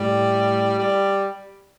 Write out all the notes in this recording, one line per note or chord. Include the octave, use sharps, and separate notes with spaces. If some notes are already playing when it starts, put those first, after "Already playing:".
Already playing: A2 G3
G3